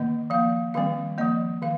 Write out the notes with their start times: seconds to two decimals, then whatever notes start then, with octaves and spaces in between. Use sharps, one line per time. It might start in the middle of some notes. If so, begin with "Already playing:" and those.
Already playing: D#3 A#3 D#5
0.30 F3 A#3 F5
0.74 D#3 G3 C4 F5
1.18 F3 A#3 D#5
1.62 D#3 F5